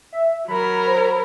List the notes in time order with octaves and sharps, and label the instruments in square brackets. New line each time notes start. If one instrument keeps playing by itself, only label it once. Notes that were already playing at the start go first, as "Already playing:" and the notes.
[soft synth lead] E5
[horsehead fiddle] F#3 A#4 [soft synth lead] B5
[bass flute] C5